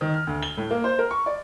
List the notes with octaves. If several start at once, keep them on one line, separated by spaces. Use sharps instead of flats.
D#3
F6
D2
G7
A2
A#3
C5
A#4
C#6
D5